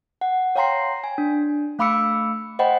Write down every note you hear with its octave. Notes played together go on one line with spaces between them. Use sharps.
F#5
C#5 F5 G5 A#5 C6 C7
G#5
D4
A3 F5 B5 D6 E6 C#7
C5 D#5 F#5 G5 B5